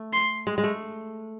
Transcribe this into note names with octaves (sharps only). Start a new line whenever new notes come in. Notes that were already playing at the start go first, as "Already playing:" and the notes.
Already playing: A3
C6
G#3
G#3
A3